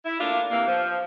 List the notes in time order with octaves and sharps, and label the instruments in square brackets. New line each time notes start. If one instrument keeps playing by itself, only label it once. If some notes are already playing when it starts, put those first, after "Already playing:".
[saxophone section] E4
A3 A#3 D4 F4
C3 E3 A#3
F3